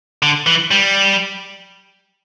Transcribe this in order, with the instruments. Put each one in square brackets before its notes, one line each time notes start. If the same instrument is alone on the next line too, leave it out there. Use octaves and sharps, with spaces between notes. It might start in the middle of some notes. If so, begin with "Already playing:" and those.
[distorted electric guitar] D3
E3
G3